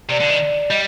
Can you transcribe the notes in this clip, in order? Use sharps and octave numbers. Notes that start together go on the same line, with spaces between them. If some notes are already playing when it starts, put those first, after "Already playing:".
C3 D5
D3
D#3
G3 D#5